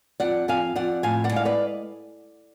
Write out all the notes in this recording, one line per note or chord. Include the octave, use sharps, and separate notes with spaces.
F2 D5 F#5
F2 F5 G#5
F2 D5 F#5
A2 F5 G#5
D5 F#5
G#3 F5
B4 D5